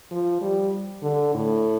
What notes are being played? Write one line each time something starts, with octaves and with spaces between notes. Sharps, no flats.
F3
G3
D3
A2